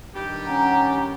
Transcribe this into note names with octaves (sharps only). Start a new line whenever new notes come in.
G2 D#3 G4
C#4 F#5 A#5